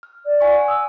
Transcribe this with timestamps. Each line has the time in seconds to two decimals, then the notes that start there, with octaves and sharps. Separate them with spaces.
0.03 F6
0.25 D5
0.41 F#5 G#5 C#6
0.68 D#6 E6